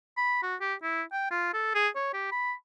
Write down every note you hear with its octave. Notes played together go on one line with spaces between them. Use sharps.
B5
F#4
G4
E4
G5
F4
A4
G#4
C#5
G4
B5